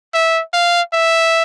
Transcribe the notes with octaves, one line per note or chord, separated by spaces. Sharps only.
E5
F5
E5